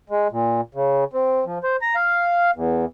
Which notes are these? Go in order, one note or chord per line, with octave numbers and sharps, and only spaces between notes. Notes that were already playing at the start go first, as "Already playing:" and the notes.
G#3
A#2
C#3
C4
F3
C5
A#5
F5
E2